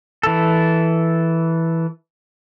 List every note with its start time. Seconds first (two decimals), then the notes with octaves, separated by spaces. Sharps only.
0.23 E3 A4